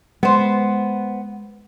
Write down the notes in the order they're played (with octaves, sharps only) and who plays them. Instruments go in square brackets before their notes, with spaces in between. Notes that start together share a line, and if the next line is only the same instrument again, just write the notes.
[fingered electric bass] G#3 [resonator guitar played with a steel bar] B3 C5